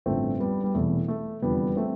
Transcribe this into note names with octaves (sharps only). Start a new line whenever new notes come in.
A1 G2 D3 F3 A3 C4
G3 B3
G3
E1 E2 C3 E3 A3
A3
F1 E2 D3 F3 G3 B3
A3 C4